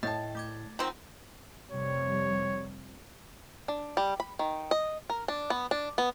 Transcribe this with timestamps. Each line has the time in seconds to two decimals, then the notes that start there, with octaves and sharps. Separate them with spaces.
0.03 A2 D#5 G5 A5 A6
0.35 A3 D6 G#6
0.79 D#3 C4 F4 F#5 A#5
1.70 F1 C3 G3 C#5
3.68 D4
3.97 G3
4.20 B5
4.39 D#3
4.71 D#5
5.10 A#4
5.28 D4
5.50 B3
5.71 D4
5.98 B3